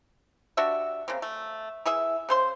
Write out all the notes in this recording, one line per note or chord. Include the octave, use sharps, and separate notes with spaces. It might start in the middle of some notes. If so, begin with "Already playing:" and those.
D4 F#4 G4 E5
C#3 A#3 C4
A3
E3 G#4 E5
C#3 C5 C6